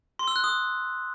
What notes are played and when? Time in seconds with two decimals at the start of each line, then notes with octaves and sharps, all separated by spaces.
0.19 C6
0.28 E6
0.36 F#6
0.44 D#6